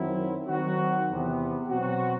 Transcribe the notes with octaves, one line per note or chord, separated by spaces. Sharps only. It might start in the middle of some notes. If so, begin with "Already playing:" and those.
Already playing: F#2 D#3 F#3 C4 E4
D#3 F#3 C4 F#4
E2 C3 E3 B3
B2 F#3 C4 F#4